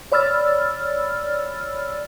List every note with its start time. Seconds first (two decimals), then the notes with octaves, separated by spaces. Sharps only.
0.12 C#5 D5 B5 E6 F6 A6